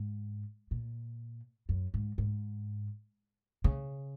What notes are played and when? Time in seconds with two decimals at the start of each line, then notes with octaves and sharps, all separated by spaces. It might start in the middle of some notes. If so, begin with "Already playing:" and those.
Already playing: G#2
0.71 A#2
1.69 F#2
1.94 G#2
2.18 G#2
3.64 C#3